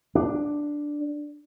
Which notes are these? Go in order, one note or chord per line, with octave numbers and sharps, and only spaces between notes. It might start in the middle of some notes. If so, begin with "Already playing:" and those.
D4